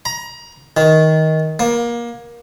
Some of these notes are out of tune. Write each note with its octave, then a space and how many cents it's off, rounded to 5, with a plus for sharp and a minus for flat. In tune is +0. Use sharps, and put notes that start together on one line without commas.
A#5 +25
D#3 +15
A#3 +25